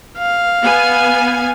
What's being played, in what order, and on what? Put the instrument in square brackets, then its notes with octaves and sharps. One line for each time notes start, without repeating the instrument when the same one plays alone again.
[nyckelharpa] F5
[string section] B3 G#5